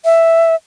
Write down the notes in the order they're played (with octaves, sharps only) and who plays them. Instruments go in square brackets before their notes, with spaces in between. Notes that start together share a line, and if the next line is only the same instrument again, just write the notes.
[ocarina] E5